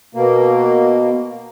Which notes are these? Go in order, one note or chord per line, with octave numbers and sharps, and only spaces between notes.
B2 A#3